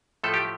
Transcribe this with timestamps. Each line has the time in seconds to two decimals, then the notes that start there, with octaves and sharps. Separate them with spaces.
0.24 A2 F3 A3 A4
0.34 G4